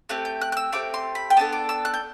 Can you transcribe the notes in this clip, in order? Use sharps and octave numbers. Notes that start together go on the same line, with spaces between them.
A3 C4 G4 F#6
G6
F#6
F#6
E6
A3 C4 G4 D6
C6
B5
G5
B3 D4 A4 A5
D6
E6
F#6
G6